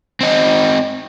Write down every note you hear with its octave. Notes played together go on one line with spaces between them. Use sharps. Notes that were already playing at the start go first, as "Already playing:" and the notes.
C4 D#4